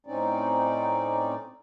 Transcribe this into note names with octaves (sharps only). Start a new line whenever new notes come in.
A2 C4 C#4 D#4 D5